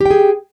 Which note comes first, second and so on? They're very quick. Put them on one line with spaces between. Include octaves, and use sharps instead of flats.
G4 G5 G#4